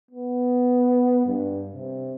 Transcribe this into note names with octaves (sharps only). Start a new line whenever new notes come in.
B3
G2
C3